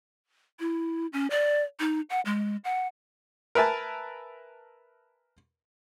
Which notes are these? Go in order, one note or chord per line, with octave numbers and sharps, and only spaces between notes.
E4
C#4
D5
D#4
F#5
G#3
F#5
A#4 B4 E5 G#5 A5